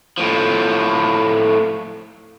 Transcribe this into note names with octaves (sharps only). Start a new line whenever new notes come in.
A2 F3